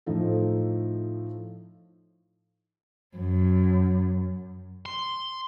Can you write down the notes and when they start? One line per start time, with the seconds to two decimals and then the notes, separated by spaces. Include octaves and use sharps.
0.06 A2 F3 D#4 A4
3.17 F#2
4.86 C6